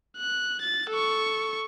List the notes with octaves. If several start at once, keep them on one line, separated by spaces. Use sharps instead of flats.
F#6
A6
A4 C#6